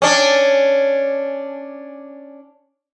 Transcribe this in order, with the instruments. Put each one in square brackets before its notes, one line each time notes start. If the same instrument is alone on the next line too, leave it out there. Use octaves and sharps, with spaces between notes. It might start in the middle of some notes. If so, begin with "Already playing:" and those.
[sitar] C#4 D4